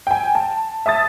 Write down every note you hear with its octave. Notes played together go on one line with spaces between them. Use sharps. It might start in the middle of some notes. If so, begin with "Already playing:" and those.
G5 G#5
A5
E5 A5 D#6 A6